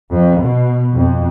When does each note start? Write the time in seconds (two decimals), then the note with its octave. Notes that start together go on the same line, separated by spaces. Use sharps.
0.12 F2
0.41 B2
0.95 F2